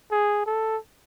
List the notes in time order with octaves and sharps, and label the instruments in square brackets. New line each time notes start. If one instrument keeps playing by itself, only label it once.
[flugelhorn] G#4
A4